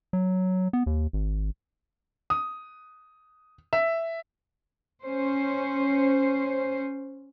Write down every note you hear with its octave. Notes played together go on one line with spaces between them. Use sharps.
F#3
B3
D#2
G#1
D#6
E5
C#4 C5